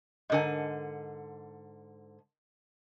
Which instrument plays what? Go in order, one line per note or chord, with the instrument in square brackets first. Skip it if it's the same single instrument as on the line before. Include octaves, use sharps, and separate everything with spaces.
[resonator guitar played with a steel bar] G#2 D3 G#5 [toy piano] A#4 D#5